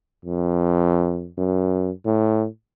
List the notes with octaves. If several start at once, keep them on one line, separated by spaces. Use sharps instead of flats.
F2
F#2
A2